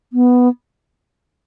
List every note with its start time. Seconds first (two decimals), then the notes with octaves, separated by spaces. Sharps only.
0.13 B3